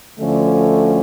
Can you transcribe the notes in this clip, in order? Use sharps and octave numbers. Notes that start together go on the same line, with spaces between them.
D2 D3 F3 A3 C#4